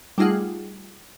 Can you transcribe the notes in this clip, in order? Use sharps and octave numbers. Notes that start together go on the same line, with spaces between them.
G3 A3 D#4 F4 G#4 F#5